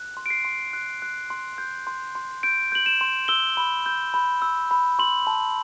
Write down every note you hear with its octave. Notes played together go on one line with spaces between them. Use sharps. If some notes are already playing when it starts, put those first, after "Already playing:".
Already playing: F#6
C6
D7
C7
C6
F#6
F#6
C6
G6
C6
C6
G6 D7
G6 F#7
E7
C6
E6 G7
B5
G6
B5
E6
B5
C6 F#7
A5